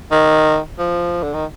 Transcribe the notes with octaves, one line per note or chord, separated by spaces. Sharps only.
D#3
F3
D3
D#3